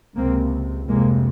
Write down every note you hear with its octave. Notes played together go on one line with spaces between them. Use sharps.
C#2 C3 A#3 C4
F1 F2 C3 G#3 A#3